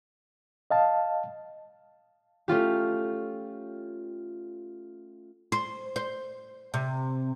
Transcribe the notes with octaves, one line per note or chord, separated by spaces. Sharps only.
D#5 F5 A5
A3 C#4 F4 G4
C5
C5
C3